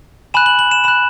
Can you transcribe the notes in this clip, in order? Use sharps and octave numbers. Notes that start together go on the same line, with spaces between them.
G#5 B5 F#6 E7
F#7
F#7
E7
B5 F#6 E7